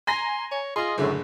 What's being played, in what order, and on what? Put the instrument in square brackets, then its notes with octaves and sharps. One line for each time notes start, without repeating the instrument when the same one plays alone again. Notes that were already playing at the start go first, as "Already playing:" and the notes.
[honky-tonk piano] G#5 A#5 A#6 [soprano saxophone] C6
[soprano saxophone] C#5
[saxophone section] F4 D#5 [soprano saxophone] G#4 [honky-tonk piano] C6
[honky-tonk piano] F#1 D3 G#3 [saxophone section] F#2 A2